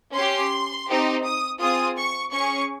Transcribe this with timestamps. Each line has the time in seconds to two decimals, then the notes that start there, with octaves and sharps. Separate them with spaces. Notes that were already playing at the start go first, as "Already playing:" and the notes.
0.15 C#4 G4 C6
0.89 C4 D#4 G4
1.24 D#6
1.61 C4 F4 G#4 D#6
1.98 C#6
2.34 C#4 G#4 C#6